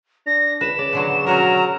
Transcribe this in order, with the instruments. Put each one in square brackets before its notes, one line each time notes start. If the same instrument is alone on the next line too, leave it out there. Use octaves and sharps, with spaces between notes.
[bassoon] D4 [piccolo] A#6
[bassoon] C#2 [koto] B4 [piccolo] E7
[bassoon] C#3 [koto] D5
[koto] B2 D3 F#3
[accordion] F#3 A#5 [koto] C#4 F#4 A#4